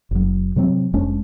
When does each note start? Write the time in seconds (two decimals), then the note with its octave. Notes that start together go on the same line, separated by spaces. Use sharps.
0.11 F#1 F#3
0.56 C3 F3 F#3 C4
0.93 F1 G#3 C#4 D4